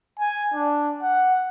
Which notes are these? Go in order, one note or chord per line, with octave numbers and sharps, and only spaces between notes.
G#5
D4
F#5